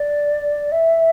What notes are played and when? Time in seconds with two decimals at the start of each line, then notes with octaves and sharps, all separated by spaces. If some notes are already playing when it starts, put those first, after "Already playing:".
Already playing: D5
0.72 E5